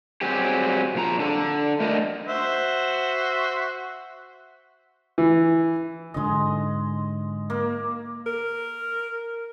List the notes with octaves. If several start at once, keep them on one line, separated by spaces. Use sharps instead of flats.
F#3 G3 C4 G4 G#4
A#2 F3 A#5
D4 A4
A3 A#4 D5 D#5
F#4 C5 E5
E3
G#2 D3 F3 G#3 D#5
A#3
A#4